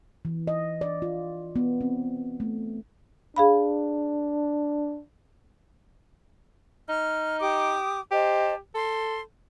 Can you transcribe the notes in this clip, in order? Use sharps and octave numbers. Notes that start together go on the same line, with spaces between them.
E3
D#5
D5
F4
B3
C4
A3
D4 G#4 F5 B5
D#4 F6
G4 D6 D#6
G4 C5 D#5 A5
A4 C6